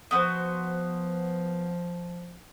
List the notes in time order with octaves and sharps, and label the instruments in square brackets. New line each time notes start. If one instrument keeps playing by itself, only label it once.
[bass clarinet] F3 [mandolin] B3 F#4 C5